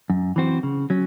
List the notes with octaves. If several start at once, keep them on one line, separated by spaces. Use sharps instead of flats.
F#2
E3 C4 F#4 C5
C#3
F#3 C#4